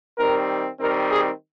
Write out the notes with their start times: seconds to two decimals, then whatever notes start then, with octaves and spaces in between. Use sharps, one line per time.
0.17 D#3 G3 C4 A#4
0.80 D#3 G3 C4 A#4
1.10 G#4